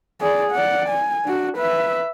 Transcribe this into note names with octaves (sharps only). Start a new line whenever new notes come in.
G#4 D5
D5 F#5
G#5
D4 F#4
B4 E5